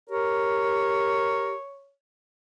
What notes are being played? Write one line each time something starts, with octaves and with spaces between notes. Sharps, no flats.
G4 A#4 C#5